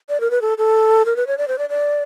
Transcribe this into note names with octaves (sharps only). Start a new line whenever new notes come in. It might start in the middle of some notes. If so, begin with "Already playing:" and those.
D5
A#4
B4
A4
A4
A#4
B4
C#5
D5
C5
D5
D5